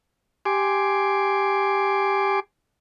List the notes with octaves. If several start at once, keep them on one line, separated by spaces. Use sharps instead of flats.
G4 G#5 C6 D6